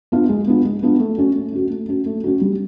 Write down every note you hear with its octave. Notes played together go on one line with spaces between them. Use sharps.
B3 D4 F4
G#3
B3 D4 F4
G#3
B3 D4 F4
A3
C#4 F#4
A3
C#4 F#4
A3
C#4 F#4
A3
C#4 F#4
G3